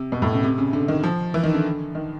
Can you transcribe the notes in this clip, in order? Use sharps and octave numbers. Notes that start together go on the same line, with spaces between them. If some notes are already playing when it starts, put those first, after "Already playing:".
Already playing: C3
B2
A2
C#3
C3
C#3
D3
D#3
F3
E3
D#3
D3
D#3